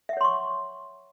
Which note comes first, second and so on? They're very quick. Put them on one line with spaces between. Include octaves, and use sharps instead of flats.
E5 F#5 C#5 C6 C#6